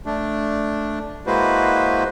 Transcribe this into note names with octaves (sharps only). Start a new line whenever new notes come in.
A3 D4
G#3 A#3 E4 F#4 B4 C5